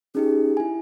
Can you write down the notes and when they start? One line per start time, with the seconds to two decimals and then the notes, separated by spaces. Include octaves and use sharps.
0.15 C#4 D#4 G4 G#4
0.57 E4 G#5